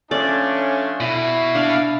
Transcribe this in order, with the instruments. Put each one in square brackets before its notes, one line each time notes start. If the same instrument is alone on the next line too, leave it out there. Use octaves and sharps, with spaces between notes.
[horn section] F3 A3 D4 [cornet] C#4 [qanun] D5
[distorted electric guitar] B2 [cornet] E4
[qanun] D4 [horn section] F5